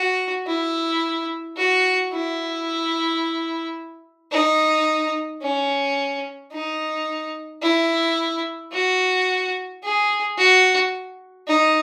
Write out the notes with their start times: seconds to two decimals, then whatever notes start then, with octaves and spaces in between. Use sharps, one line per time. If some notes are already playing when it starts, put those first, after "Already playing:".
Already playing: F#4
0.47 E4
1.56 F#4
2.12 E4
4.32 D#4
5.42 C#4
6.52 D#4
7.62 E4
8.72 F#4
9.83 G#4
10.38 F#4
11.48 D#4